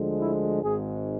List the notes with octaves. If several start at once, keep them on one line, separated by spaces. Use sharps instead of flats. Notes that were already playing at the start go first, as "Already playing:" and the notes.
Already playing: D2 D3 F3 G#3
E4
G#1 G#2 G#3 G#4